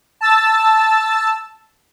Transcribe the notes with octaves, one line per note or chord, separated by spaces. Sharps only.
A5 E6 A6